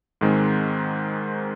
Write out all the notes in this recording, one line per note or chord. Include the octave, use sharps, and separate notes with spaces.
G#2 D#3 G#3 C4